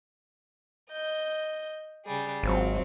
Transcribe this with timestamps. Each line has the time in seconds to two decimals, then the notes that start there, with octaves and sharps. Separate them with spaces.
0.91 D#5 G6
2.06 C#3 G3 G#4
2.43 G#1 F#3 C4 F4